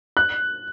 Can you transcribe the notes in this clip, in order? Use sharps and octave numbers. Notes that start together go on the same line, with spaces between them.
F#6